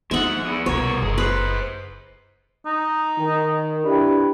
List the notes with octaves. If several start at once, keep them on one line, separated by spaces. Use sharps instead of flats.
D#2 F3 G#3 D#4 E5 F#5
B3 G#4
C2 B2 B3 A#4 C#5
F#1 A3 G#4
G#4 B4 C5
D#4
D#3
D4 E4 G4 B4